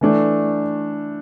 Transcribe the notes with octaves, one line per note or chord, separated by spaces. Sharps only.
E3 A3 D4